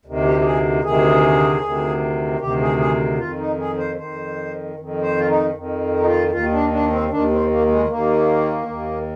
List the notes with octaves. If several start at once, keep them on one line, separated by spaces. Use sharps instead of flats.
D2 C3 D#3
G4
G4
G#4
D2 C3 D#3 G#4
D2 C3 D#3
D2 C3 D#3 G4
G#4
G#4
F2 D#3 F4
D#4
G#4
C5
F2 D#3 C5
F2 D#3
C5
F4
D#4
F2 D#3
D#4
F4
D#2 D#3 F4
D4
D4
C4
D#2 D#3 D4
C4
A#3
G#3
D#2 D#3 A#3
D#2 D#3